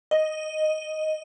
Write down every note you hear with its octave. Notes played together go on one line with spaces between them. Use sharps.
D#5